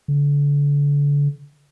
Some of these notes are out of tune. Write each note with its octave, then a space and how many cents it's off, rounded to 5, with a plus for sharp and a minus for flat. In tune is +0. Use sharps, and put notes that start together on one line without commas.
D3 -35